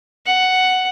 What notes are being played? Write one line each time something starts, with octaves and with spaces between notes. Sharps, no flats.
F#5